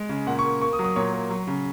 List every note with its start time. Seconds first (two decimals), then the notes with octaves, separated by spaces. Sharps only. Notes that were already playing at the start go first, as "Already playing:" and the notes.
Already playing: G#3
0.09 C#3
0.27 A#2 F#5
0.39 C#6
0.45 A#3
0.61 A#3 C#6
0.73 D#6
0.79 F#3
0.84 D#6
0.96 A#2 C#5
1.13 A#3
1.30 F#3
1.47 C#3